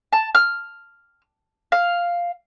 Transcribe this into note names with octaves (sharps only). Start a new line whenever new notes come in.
A5
F6
F5